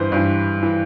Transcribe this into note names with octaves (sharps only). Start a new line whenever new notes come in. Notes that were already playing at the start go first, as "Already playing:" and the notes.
Already playing: G2 E3 B4 C5
G2 E3
E3